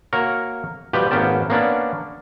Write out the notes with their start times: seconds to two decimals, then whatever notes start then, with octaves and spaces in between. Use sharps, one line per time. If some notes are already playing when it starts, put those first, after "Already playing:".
0.13 A#3 F#4 A#4 C#5
0.93 B2 F3 G3 G4 B4
1.11 G#1 A#3 B3 C#4 G5 A5
1.50 A#3 B3 C#4 D4 D5